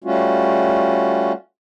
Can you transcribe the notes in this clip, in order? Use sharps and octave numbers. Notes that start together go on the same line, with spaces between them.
G3 A3 C#4 F4 F#4